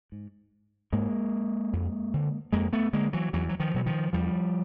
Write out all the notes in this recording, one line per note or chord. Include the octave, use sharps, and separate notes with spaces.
G#2
G#2 G#3 A#3
F2
D3
F2 G#3 A#3
A3 B3
D3 G#3 A#3
E3 F#3
E2 E3 F#3
F#3
D#3 F3
B2 F#3
D#3 F3
E2 F3 G3